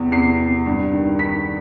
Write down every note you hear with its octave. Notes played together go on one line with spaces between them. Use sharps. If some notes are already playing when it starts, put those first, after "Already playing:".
Already playing: E2 C3
E2 C7
C3
G2
D#3
D#3 B6